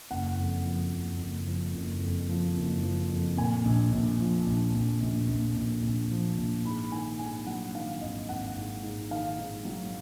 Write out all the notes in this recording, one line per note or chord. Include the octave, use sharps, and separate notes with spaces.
F#1 F#5
F2
F3
F#1
F#1
F3
F#1
F2
F3
F#1
F3
F2
A#2 G#5
A#1
A#1
F3
A#1
A#1
A#1
A#1
A#1
A#1
F3
A#1
G#2 B5
D#3 G#5
G#2 G#5
F#3 F#5
D#3 F5
G#1 D#5
G#1 F#5
G#2
G#2
D#3 F5
G#2
F#3